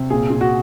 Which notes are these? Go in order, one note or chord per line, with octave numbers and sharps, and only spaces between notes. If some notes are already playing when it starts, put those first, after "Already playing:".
Already playing: C3
A#2 G#4
A#2
F#4